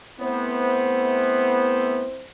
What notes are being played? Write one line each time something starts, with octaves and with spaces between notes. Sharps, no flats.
A3 B3 C4 E4 C5